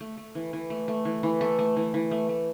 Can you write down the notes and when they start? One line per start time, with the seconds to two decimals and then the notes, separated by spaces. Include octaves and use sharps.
0.01 A3
0.18 A3
0.35 E3
0.53 E3
0.70 A3
0.88 A3
1.05 E3
1.23 E3
1.41 A3 A4
1.59 A3
1.77 E3
1.94 E3
2.11 A3
2.29 A3